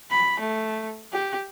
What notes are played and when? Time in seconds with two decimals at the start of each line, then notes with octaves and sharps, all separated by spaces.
0.10 B5
0.40 A3
1.12 G4